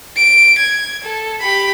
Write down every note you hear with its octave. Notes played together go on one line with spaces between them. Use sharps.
D7
G#6
A4
G4 B5